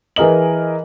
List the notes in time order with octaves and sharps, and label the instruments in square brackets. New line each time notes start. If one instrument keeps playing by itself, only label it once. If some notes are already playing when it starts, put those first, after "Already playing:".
[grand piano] E3 G#4 A#4 D#5 F#7